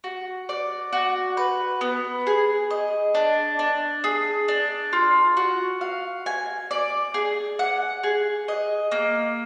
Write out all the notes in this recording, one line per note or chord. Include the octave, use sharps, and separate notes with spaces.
F#4
D5
F#4
B4
B3
G#4
D#5
D4
D4
G#4
D4
F4
F#4
F5
G#5
D5
G#4
F#5
G#4
D#5
A#3